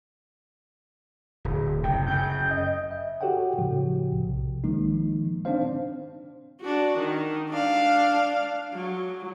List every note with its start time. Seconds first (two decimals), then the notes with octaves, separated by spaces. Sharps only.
1.45 D1
1.83 F#1 C3 G5
2.07 F#2 C#3 G6
2.51 D#5
2.91 E5
3.21 F#4 G4 A4 C#5 F#5 G5
3.59 A2 C#3 F3 F#4
4.13 B1 C3
4.64 D#3 F3 G#3 A#3 D#4
5.45 C4 D4 D#4 C5 F5
6.61 D4 F#4
6.98 D#3
7.50 D4 F5
8.74 F#3